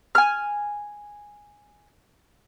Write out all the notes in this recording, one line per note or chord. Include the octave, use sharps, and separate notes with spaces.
G#5 F6